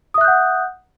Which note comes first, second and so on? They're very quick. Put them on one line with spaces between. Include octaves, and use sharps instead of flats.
D#6 E5 F#6 G6 F#5